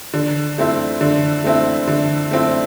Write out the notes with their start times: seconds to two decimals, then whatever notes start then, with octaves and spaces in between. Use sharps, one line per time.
0.14 D3
0.58 A3 C4 E4
1.01 D3
1.44 A3 C4 E4
1.88 D3
2.31 A3 C4 E4